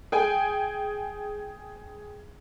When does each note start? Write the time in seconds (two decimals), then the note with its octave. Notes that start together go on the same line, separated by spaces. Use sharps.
0.12 G#4 G5 G#5